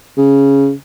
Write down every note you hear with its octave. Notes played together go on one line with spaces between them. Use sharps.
C#3